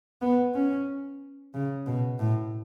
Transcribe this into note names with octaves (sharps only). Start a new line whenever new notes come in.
B3
C#4
C#3
B2
A2